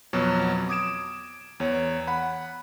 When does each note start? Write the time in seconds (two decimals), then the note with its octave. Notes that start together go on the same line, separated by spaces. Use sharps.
0.13 F2 B2 F#3
0.69 D6 D#6 G#6 D7 E7
1.60 E2 C#5
2.07 F#5 B5